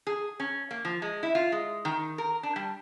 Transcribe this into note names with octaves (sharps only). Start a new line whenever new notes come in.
G#4
C#4
A#3
F3
G#3
E4
F4
G#3
D#3
A#4
D4
G3